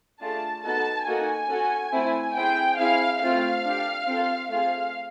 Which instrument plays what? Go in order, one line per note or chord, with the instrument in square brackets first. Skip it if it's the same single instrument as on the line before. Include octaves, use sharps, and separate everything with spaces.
[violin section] A3 D4 F4 G#4 A5
B3 D#4 F#4 A4 A5
A#3 D#4 F#4 A4 G#5
C#4 F#4 A4
A3 C4 E4
C4 E4 G#4 G5
C4 E4 G#4 F5
A3 C4 F4 F5
D4 G4
C4 F4 A4
A3 C4 F4 G#4 F5